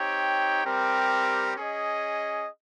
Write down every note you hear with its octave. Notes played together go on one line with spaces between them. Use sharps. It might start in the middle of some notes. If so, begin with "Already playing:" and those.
Already playing: C4 D#4 G4 C#5 G5
G3 C4 G4 A#4
C#4 G#4 D#5